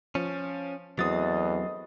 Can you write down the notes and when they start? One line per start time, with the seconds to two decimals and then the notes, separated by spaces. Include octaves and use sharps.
0.15 F3 C#4
0.99 E2 G2 F#3 A3 C4 D#5 D#6 A6